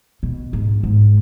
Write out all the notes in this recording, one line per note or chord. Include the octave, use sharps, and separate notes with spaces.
B2
G#2
G#2